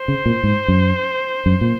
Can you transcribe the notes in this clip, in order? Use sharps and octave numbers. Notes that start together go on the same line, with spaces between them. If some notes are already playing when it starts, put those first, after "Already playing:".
Already playing: C5
C#3
A#2
G#2
F#2
F#2
A#2